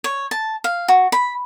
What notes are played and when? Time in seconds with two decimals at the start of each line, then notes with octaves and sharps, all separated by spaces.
0.04 C#5
0.31 A5
0.64 F5
0.88 F#4
1.12 B5